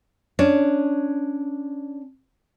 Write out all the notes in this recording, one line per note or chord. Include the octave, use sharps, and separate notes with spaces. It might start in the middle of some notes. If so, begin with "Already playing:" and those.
C#4 D4